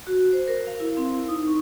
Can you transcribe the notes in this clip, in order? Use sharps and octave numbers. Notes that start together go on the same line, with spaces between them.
F#4
C5
A#4
F5
E4
C4
E4
D#4
C#6